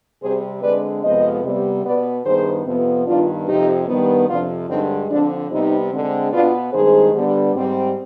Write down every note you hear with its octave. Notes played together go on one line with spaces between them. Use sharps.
C3 G3 C4 G#4 C5
D3 G#3 C4 B4 D5
F2 C3 F3 G#3 B3 C5 D#5
C3 G3 B3
B2 B3 B4 D5
G2 D#3 B3 G#4 C5
F2 C3 F3 B3
G2 D#3 B3 D4 F4
F2 C3 F3 C4 D#4 G4
G2 D#3 G3 B3
F2 C3 F3 D4 F4
G2 D3 G#3 C4 D#4
D3 F3 C4 D4
C3 G3 B3 C4 D#4
D3 G#3 C4
B2 B3 D4 F4
G2 D#3 G#3 C4 G#4 C5
D3 G3 B3
G#2 G3 C4